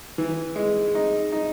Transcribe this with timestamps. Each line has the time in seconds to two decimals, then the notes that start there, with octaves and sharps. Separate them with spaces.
0.18 E3
0.56 G#3
0.95 D#4
1.32 D#4